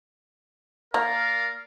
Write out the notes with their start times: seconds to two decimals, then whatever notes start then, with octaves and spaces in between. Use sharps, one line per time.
0.94 A#3 A#4 D5 F5